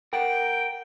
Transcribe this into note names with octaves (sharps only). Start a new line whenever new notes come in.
A#4 F#5 G5